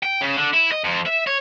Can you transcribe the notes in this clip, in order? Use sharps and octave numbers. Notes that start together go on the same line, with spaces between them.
G5
C#3
D3
E4
D#5
F2
E5
C#5